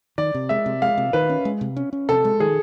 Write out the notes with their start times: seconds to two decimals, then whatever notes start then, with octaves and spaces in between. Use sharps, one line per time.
0.18 D#3 D5
0.34 C3
0.49 G#3 E5
0.66 C3
0.82 G#3 F5
0.98 C3
1.13 D#3 B4
1.30 C#4
1.45 G#3
1.61 C3
1.77 C#4
1.93 C#4
2.09 C3 A4
2.25 G#3
2.40 D#3 G#4